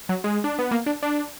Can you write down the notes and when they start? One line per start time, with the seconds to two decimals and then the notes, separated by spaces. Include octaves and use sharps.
0.09 F#3
0.24 G#3
0.44 D4
0.59 B3
0.71 A#3
0.86 D4
1.03 D4